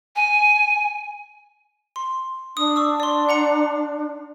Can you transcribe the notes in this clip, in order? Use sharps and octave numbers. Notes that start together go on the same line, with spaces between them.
G#5
C6
D4 D#6
C#6 E6
D5 C6
F#5 A#5 C#7